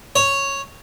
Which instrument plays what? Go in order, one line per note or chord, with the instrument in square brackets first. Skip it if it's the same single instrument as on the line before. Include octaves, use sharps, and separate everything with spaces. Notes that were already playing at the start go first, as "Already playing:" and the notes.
[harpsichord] C#5